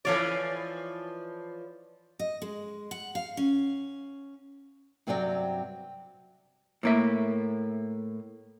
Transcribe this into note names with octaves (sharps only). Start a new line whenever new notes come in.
E3 F3 C#5 D5 F5 B5
D#5
G#3
F#5
F5
C#4
G2 C3 F#3 C4 D5 G5
A2 A#3 E5